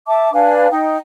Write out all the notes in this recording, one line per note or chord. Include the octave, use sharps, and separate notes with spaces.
E5 A5 D6
D4 B4 F5 G#5
D#4 G5